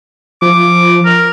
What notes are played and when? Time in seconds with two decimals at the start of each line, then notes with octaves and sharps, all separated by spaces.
0.42 F3 D6
1.05 A#4